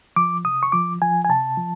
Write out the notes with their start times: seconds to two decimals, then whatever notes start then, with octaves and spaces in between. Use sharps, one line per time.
0.16 F3 D6
0.44 C3 D#6
0.63 C#6
0.72 F3 D6
1.01 F3 G#5
1.25 G#5
1.29 C3 A5
1.57 F3